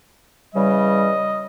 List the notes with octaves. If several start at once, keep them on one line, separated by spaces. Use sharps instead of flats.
C#3 E3 G3 D#5